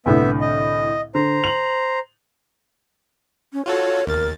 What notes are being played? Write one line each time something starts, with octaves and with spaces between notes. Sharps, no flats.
C2 A2 D3 B3 E5
D#5
D3 C5 A#5
F7 F#7
C#4
F4 F#4 A4 C#5
D#2 A#4 A6